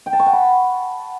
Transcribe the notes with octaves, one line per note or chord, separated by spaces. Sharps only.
G5
A5
C#6
F#5
B5